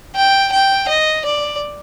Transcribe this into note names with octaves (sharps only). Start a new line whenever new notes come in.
G5
G5
D#5
D5